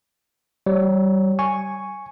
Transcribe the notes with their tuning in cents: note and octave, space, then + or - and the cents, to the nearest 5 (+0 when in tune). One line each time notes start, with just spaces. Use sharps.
G3 -30 C#5 -20
G#5 +0 C#6 +0